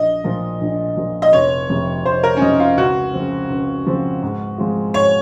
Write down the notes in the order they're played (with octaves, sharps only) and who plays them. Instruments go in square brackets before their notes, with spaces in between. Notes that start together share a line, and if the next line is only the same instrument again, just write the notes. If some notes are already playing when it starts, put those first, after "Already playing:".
Already playing: [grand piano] A#1 [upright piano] D#5
[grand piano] A#2 F3
A#1
A#2 F3
[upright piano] D#5
[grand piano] F1 [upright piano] C#5
[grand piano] F2 C3
[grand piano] F1 [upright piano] C5
[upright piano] A#4
C#4
[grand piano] F2 C3 [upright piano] D#4
[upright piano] F4
[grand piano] C#2 [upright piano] F#4
[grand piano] C#3 F3 C4
C#2
C#3 F3 C4
G#2
F3 G#3 C4 F4
[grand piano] G#2 [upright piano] C#5